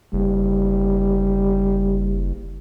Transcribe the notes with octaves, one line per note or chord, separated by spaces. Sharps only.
F#1 G3